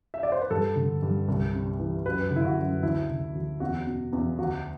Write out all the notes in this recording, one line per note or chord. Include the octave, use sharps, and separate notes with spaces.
E5
D5
C5
B4
G2 A4
D3
G2
C2
C3
E3
F#2 B4
D3
E4
F#4
F#2
D2 E4
D3
D2
E2 F#4
B2
E2
D2 F#4